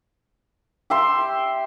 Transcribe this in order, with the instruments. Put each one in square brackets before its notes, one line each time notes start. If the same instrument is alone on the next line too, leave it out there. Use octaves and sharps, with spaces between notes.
[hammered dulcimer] G4 E5 C6